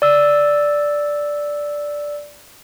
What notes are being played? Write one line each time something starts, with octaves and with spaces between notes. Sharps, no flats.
D5 E6